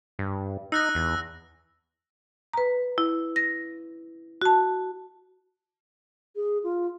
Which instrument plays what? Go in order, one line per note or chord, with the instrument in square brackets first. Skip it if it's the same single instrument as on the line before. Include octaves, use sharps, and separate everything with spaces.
[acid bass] G2
[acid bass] D#4 [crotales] E6 F#6 A#6
[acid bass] E2
[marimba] B4 A#5
E4
A#6
F#4 A5
[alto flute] G#4
F4